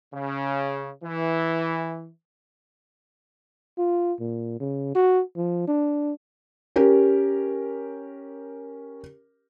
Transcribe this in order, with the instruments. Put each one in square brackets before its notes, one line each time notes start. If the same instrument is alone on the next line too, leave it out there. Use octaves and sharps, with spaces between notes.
[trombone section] C#3
E3
[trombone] F4
A#2
C#3
F#4
F3
D4
[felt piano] C#4 G4 A#4